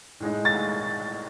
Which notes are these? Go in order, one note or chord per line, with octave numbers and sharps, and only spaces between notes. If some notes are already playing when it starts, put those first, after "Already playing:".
A2 G#3 D#4
A6